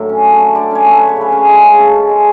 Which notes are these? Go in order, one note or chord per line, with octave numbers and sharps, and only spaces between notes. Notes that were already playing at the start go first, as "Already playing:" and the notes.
Already playing: A2 D3 F#3 E5
C#4
A3
D3
D3 D5
C#4 C#5
A3
B4
D3
C#5
C#3 B4
C#4
G#3
C#3
C#3 A4
C#4
G#3